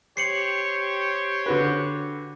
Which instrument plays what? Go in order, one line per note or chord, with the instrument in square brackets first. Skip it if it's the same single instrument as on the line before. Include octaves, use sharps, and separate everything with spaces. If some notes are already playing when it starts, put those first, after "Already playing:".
[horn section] G4 C5 C#5 [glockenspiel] C7 C#7 F#7
[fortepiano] D3 F#4 B4